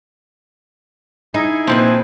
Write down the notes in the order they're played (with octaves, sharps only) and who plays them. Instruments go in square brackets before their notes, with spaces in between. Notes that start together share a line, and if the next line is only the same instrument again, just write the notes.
[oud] D#4 [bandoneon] E4 G#4 G#5
[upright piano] A#2 [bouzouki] F3 C4 B4